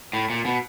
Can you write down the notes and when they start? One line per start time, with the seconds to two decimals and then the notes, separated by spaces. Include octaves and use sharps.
0.13 A2
0.30 A#2
0.46 B2